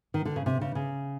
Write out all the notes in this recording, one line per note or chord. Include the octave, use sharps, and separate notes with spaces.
D#3
D3
C#3
C3
C#3
C#3